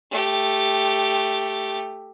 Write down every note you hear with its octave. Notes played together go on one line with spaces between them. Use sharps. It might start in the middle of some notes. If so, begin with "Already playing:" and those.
A3 G4